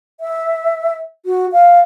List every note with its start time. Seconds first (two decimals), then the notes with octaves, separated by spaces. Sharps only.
0.20 E5
1.26 F#4
1.52 F5